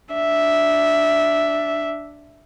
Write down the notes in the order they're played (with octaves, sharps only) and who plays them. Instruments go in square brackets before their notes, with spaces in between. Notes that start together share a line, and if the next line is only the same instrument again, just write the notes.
[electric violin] D4 E5